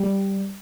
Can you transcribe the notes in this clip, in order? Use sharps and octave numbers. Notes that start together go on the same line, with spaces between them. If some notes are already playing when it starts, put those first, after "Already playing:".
Already playing: G3